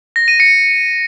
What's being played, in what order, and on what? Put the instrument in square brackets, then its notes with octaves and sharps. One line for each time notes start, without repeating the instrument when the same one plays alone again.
[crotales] A#6
D#7
C#7